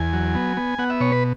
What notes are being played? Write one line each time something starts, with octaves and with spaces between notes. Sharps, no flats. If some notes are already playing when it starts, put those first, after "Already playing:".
Already playing: E2 G#5
F#3
B3
B3
B3 F#5
E5
B2 C#5
B4